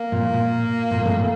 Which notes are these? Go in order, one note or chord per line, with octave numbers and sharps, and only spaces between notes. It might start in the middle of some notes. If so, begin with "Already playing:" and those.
Already playing: A#3
A#2
A#2
A#2
A2
A#2